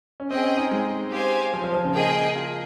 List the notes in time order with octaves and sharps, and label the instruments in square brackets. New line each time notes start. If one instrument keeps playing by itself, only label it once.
[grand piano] C#4
[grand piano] C4 [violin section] G#4 D#5 G5
[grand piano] C#4
D#4
G#3
[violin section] G4 C5 F5 G#5
[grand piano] F3
F3
F3
C#3
[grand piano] A#3 [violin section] G#4 D#5 G5
[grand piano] F4